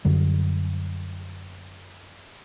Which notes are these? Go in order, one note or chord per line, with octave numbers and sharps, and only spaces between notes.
F#2 D3 G3